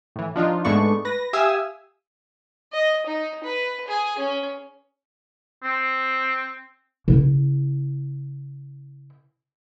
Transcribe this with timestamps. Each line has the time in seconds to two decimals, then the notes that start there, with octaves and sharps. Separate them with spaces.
0.16 A2 E3
0.36 F3 D4 D#4 F4
0.65 G#2 G#3 A3 B3 D4 C#6
1.05 B4 A#6
1.33 G4 E5 F5 G#5 D#6 E6
2.73 D#5
3.06 D#4
3.44 B4
3.88 G#4
4.18 C#4
5.63 C4
7.08 C#3 E4